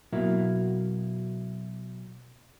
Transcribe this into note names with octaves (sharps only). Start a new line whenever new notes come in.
B2 F#3 A#3 E4